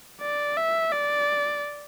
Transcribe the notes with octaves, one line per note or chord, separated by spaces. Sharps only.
D5
E5
D5